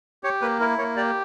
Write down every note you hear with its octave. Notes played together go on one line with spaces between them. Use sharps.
G4 C#5
A#3 B4
E4 A#4
A#3 C#5
G4 D5